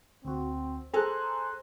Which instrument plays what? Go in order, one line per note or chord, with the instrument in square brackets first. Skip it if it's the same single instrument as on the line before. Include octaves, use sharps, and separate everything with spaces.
[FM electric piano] D2 F#4 [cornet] C4
[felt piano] G#4 A4 [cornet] C5 [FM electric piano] A#5 F#6